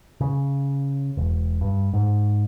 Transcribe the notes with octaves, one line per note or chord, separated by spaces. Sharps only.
C#3
E1
G2
G#2